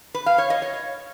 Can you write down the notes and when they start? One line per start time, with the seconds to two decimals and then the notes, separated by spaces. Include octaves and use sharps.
0.14 B4
0.26 F5
0.38 C#5
0.50 D#5
0.62 C#5